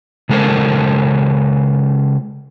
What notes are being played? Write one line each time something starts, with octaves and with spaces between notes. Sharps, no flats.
C#3 G#3 A4 A#4 C5